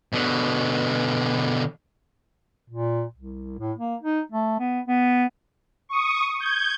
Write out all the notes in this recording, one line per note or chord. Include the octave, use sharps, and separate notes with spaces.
B2 D3
A#2
C2
A2
A#3
D#4
A3
B3
B3
C#6 D#6
G6 G#6